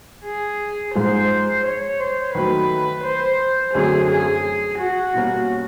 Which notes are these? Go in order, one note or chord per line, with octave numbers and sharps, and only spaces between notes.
G#4
G#2 F3 G#3 C5
C#5
C5
D#3 F#3 A3 B4
C5
F#2 D3 F#3 A3 C4 G#4
G#4
F#4
B2 G3 A#3 C#4